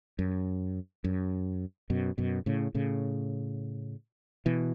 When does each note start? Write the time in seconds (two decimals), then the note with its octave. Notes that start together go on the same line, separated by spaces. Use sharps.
0.19 F#2
1.04 F#2
1.90 F#2 B2
2.18 F#2 B2
2.46 A2 C#3
2.75 A2 C#3
4.46 B2 E3